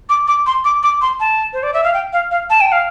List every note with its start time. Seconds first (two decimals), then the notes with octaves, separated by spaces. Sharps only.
0.09 D6
0.28 D6
0.46 C6
0.65 D6
0.83 D6
1.02 C6
1.20 A5
1.53 C5
1.63 D5
1.74 E5
1.84 F5
1.94 G5
2.13 F5
2.31 F5
2.50 A5
2.61 G5
2.72 F5